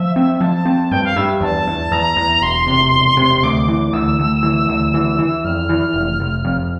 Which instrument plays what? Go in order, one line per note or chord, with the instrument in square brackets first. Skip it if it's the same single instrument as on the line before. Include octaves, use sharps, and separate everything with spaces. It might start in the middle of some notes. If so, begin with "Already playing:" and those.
Already playing: [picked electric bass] F3 [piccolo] E5
[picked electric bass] C4
[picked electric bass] F3 [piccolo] A5
[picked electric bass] C4
[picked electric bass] G2 [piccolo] G5
[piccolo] F5
[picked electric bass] G2 [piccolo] E5
[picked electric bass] E2 [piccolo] A5
[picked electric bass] E2
[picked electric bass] E2 [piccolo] A#5
[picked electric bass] E2
[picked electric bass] E1 [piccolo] C6
[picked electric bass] C3
E1
C3
[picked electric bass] D2 [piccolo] D6
[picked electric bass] E3
[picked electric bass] D2 [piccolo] E6
[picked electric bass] D2
E3
D2
E3
E3
[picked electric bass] F2 [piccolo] F6
[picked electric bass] E3
F1
F1
F2